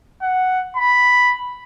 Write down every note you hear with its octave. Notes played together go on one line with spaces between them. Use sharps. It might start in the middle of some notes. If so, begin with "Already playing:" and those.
F#5
B5